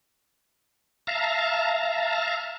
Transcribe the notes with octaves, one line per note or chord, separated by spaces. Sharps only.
E5 F5 A5 A#5